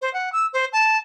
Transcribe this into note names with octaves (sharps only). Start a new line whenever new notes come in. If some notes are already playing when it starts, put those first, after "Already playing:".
C5
F#5
E6
C5
A5